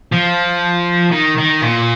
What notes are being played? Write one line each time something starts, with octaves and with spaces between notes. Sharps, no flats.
F3
D#3
D#3
A#2